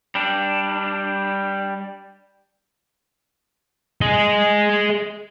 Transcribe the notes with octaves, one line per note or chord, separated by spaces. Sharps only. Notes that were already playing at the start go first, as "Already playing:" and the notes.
G3 D4
G#4 D#5